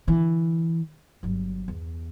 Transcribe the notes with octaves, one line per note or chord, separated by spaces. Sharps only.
D3 E3
G1 F#3
E2